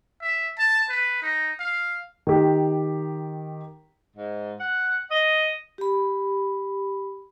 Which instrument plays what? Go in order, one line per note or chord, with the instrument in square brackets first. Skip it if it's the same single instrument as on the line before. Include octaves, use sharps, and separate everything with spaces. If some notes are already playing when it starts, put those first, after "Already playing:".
[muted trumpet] E5
A5
B4
D#4
F5
[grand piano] D#3 G4
[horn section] G#2
F#5
D#5
[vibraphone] G4 B5